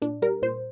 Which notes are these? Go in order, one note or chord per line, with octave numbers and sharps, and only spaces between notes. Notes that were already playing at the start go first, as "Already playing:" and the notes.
A#2 D4
G3 A#4
A#2 C5